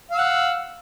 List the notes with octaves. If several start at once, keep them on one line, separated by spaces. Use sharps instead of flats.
F5 F#5 E6